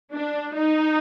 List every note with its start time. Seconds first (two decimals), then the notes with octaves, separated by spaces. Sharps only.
0.13 D4
0.54 D#4